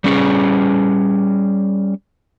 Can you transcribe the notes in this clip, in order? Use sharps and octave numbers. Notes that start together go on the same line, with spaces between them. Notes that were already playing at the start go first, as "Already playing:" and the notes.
G3 C#4 G#4